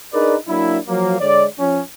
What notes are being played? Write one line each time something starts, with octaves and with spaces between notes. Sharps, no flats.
D4 D#4 G#4 A#4 B4 D5
F#3 A#3 D4 E4
F3 F#3 A#3
D3 G#3 C#5 D5
F3 C#4